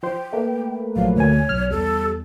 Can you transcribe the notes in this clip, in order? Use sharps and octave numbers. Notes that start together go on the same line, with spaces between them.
F3 C5 G5
A3 A#3 B4
A#1 F3 F#3 F5
D2 C#5 G#5
B1 F6
E2 G3 A4